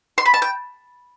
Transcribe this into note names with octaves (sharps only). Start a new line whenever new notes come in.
C6
B5
A5
G5